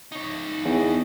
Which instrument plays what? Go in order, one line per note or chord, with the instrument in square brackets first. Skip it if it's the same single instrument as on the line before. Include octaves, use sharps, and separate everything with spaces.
[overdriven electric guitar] D#4 C#5
[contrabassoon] E2